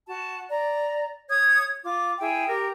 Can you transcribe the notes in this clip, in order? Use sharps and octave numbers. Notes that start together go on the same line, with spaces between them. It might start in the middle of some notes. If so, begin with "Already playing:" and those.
F#4 A5
D5 A#5
C#5 D#6 G#6
F4 D6
E4 G#4 G5
G4 A#4